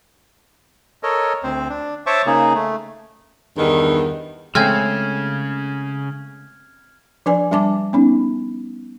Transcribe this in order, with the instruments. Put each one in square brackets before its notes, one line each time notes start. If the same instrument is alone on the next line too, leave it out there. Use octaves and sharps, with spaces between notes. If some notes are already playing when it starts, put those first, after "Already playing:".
[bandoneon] A4 A#4 C#5 D#5
D2 C4 C5
D4
C5 C#5 E5 A5 C#6 D6
C#3 A#3 D#4 G#4
A3
[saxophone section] E2 G2 D#3
[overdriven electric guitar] C#3 [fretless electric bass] G#3 A3 C#4 [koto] C4 G#5 [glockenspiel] F6 G#6
[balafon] F3 D4 B4 D5 G#5
G3 D4 A5 D6
B3 C#4 D#4